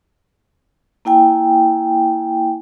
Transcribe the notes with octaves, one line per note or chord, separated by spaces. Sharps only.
A#3 E4 G5 G#5